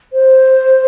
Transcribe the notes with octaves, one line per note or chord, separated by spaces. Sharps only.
C5